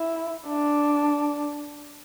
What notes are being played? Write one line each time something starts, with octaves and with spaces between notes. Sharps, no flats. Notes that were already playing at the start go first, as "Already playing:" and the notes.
Already playing: E4
D4